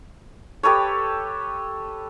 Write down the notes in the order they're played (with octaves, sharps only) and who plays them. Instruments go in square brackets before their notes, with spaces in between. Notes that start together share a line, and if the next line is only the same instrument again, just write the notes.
[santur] G4 A4 B4 C#5